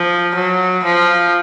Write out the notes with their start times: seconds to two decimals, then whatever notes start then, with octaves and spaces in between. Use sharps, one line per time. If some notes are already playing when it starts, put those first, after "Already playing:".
Already playing: F3
0.35 F#3
0.85 F3